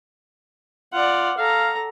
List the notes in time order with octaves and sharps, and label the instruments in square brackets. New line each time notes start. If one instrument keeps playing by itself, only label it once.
[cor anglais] F4 [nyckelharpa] D5 F#5
[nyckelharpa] A4 A#5 [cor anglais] F5